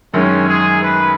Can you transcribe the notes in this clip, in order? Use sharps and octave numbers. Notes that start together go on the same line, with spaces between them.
F#2 D#3 G#3 C#4
G#4
B4